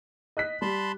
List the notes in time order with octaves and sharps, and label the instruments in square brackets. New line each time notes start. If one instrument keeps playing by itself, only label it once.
[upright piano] D#5 F#6 B6
[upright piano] G3 [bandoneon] A5 B5 C6